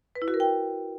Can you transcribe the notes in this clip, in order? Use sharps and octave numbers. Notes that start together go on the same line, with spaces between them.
B4
E4
F#4
A#4
G5